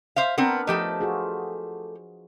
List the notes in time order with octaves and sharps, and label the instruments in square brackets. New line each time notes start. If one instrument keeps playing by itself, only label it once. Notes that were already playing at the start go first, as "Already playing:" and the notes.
[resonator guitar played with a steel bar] C5 E5 F5
[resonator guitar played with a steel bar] B3 C4 [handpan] D4 A#4 B4
[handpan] F3 D#5 [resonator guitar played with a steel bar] A3 G4 A4
[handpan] F4 F#4 G#4